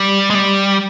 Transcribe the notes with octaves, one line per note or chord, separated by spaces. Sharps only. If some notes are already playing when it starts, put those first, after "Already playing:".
Already playing: G3
G#3
G3